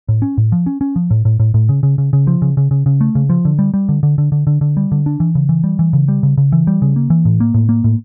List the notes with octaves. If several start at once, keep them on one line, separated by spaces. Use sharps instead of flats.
A2
C#4
A2
F3
C#4
C#4
F3
A2
A2
A2
A2
C#3
C#3
C#3
C#3
F3
C#3
C#3
C#3
C#3
A3
C#3
F3
D3
G3
G3
D3
D3
D3
D3
D3
D3
G3
D3
D4
E3
C#3
E3
G3
E3
C#3
G3
C#3
C#3
E3
G3
C#3
A#3
E3
A2
A#3
A2
A#3
A2